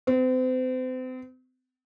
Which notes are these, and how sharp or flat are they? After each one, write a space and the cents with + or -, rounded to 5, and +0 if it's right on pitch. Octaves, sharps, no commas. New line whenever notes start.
C4 -35